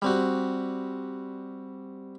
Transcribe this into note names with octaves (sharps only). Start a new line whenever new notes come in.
G3 C4 F#4